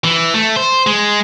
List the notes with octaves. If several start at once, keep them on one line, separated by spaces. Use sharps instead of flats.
E3
A3
C5
G#3